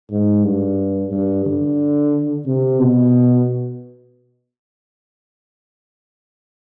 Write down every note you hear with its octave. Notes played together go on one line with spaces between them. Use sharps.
G#2
G2
G2
D3
C3
B2